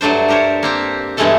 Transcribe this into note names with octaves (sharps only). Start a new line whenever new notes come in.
G2 F#3 A3 D4 C5
D4 G4 A#4 C5 C#5
A#3 C4 G4
E2 G2 E3 G#3 A3 A4